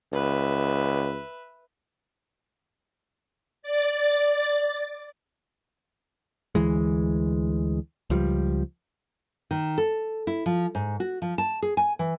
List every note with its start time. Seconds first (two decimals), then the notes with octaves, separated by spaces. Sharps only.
0.13 C#2 B4 E5
3.62 D5 A6
6.55 D2 E3 G#3
8.10 C#2 F3 G3
9.51 D#3
9.78 A4
10.27 E4
10.46 F3
10.75 G#2
11.00 F#4
11.22 F3
11.38 A5
11.62 G#4
11.77 G#5
11.99 E3